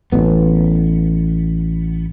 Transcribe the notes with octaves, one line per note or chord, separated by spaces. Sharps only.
A1 B3